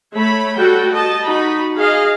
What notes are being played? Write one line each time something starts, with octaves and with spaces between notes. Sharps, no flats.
A3 C#5 B5
G3 F#4 A4 G5
D#5 A5
D#4 F#4 B5
G#4 D#5 F5